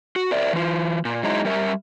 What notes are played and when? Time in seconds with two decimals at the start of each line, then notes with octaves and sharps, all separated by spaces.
0.16 F#4
0.31 A#4 D5 E5
0.53 E3 F4
1.05 A#2
1.23 F#3 G#3 D#4 E4
1.45 G3 A#4 E5